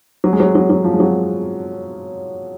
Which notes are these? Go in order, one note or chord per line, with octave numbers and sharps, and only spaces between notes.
F#3
G#3
F#3
F#3
F#3
F3
G#3
F#3